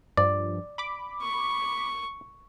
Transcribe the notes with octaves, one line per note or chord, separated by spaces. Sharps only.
G2 F3 D5
B5 D6
C#6